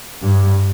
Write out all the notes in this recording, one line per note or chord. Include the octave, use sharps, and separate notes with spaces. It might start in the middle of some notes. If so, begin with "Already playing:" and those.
G2